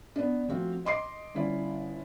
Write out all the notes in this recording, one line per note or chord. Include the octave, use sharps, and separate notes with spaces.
B3 D4
F3 A3 C4 F#4
D#5 C6 D6 C7
G1 C#4 E4 D5